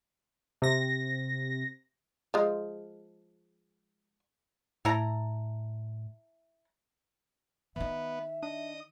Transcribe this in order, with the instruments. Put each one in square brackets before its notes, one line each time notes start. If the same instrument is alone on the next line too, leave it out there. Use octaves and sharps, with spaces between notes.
[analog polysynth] C3 A#6
[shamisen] F3 G#3
[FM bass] A2 [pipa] E4 A4 A#5
[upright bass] D#3 D#4 [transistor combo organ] B3 [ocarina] E5
[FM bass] D4 [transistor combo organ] D#5 D#6